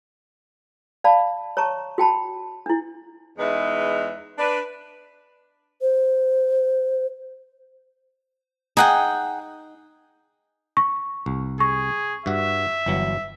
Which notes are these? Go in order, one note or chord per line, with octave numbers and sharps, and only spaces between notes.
D5 F5 A5 B5
C#5 A5 A#5 C#6
F#4 G5 A5 B5
D4 E4
E2 G#3 D#4 B4 E5
D4 B4
C5
D#4 G#4 F#5 G5
C#6
C2
G#4 C#6
G2 F#4 E5
G1 E3 F#3